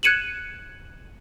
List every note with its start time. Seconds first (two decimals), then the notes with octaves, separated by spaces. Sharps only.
0.03 F#6 G#6 C#7 D#7 E7 F#7